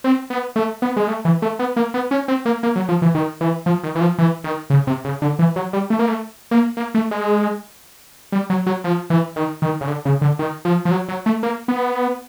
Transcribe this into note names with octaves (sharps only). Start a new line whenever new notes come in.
C4
B3
A3
B3
G#3
A3
E3
A3
B3
A#3
B3
C#4
C4
A#3
A#3
F#3
F3
E3
D#3
E3
F3
D#3
E3
F3
E3
D#3
C#3
C3
C#3
D3
E3
F#3
G3
A3
A#3
A3
A#3
A#3
A3
G#3
G3
F#3
F#3
F3
E3
D#3
D#3
C#3
D3
C#3
D3
D#3
F3
F3
F#3
F#3
A3
A#3
B3